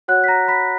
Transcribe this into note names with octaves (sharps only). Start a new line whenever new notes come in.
F#4 C#5 F#5 F#6
B6
A#5 A#6
B5 B6